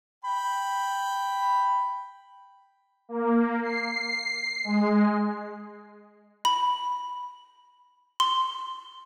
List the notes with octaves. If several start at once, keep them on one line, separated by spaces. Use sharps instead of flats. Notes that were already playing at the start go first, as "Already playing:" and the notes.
G5 B5
A#3
C7
G#3
B5
C6